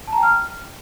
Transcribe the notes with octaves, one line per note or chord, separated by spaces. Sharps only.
A5
A#5
G5
F6